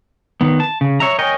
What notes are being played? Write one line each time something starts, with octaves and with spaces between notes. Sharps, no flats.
D#3 B3
A5
C#3
C#5 E5 A#5
A#4 C#5 D#5 G5 G#5